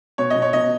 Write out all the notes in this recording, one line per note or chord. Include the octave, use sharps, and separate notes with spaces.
B2 C#5
B2 D#5
C#5
B2 D#5